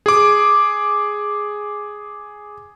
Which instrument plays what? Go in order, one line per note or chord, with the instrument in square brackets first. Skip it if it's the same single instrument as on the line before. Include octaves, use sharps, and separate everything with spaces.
[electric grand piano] G#4 D6